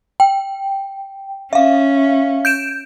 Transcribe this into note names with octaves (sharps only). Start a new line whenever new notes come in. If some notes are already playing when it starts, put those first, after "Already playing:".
G5
C#4 E5 F5
G6 D7 E7